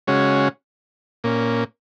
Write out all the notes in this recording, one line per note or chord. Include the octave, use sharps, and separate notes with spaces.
C#3 G#3 C#4 F#4 C#5
A#2 A#3 C#4